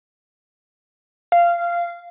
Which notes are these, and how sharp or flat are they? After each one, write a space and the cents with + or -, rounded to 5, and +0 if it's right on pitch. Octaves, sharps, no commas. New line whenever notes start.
F5 -15